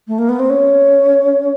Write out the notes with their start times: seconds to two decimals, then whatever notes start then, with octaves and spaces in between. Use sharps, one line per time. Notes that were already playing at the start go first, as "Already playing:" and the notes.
0.08 A3
0.18 A#3
0.29 B3
0.39 C4
0.50 C#4